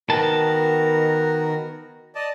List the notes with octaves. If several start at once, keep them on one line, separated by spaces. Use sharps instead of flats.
D#3 B3 F#4 A#4 A5
D5 D#5 A5